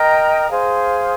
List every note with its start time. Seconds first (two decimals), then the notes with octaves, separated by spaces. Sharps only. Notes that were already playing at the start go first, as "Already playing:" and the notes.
Already playing: A#4 D#5 G5 A#5
0.49 G#4 C5 F5